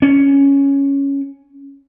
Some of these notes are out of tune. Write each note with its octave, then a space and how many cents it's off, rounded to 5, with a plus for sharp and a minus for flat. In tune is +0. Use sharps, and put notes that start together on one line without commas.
C#4 +0